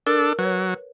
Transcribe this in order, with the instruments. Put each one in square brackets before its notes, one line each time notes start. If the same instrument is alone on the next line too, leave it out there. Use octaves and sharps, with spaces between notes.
[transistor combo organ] D4 A4 [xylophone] A#4
[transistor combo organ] F#3 [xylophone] B4 C#5